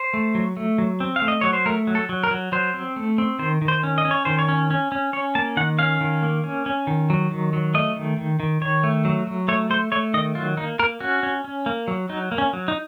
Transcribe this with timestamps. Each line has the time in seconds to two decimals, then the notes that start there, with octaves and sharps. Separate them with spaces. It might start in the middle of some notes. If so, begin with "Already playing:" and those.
Already playing: C5
0.14 A3
0.35 F#3
0.57 A3
0.78 F#3
1.00 C4
1.16 F5
1.22 A3
1.28 D#5
1.41 F#3 C#5
1.53 C5
1.66 A3 A#4
1.87 F#3
1.95 A4
2.09 F#3
2.24 A#4
2.31 F#3
2.52 F#3 C5
2.74 C4
2.96 A3
3.18 C4
3.39 D#3 C5
3.62 D#3
3.68 C5
3.83 C#4
3.98 D#5
4.05 C#4
4.11 C#5
4.25 D#3 C5
4.39 C#5
4.49 C#4
4.71 C#4
4.92 C#4
5.13 C#4 C#5
5.35 A#3 A5
5.57 D#3 F#5
5.79 C#4 F5
6.01 D#3
6.23 A#3
6.44 C#4
6.66 C#4
6.87 D#3
7.10 F#3
7.31 D#3
7.53 F#3
7.74 A3 D#5
7.96 D#3
8.17 D#3
8.40 D#3
8.61 D#3 C#5
8.83 A3
9.05 F#3
9.27 F#3
9.48 A3 C#5
9.70 A3 C5
9.92 A3 C#5
10.14 D#3 D#5
10.35 F#3 F4
10.57 A#3 D#4
10.79 A#3 A#4
11.00 C#4 F#4
11.23 C#4
11.44 C#4
11.66 A#3
11.88 F#3
12.09 F#3 D#4
12.32 A#3
12.38 C#4
12.53 F#3
12.68 D#4